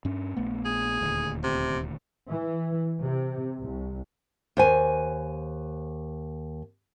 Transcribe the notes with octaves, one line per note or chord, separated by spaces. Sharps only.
G2 C#4
A#1 A3 B3
G#4
D#1 D2
C3
E3
C3
C2
D#2 C5 G#5